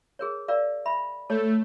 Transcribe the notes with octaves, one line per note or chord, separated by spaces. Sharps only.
G#4 A#4 C#5
A#4 D5 F5
E5 B5
A3 A4 C#5 A5